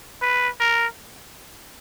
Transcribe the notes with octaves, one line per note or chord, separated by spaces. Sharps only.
B4
A#4